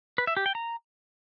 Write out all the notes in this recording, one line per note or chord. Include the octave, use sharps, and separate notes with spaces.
B4
E5
G4
G5
A#5